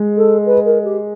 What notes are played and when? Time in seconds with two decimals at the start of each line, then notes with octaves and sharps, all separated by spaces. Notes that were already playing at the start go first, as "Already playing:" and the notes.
Already playing: G#3
0.16 A4
0.45 B4
0.65 A#4
0.84 G4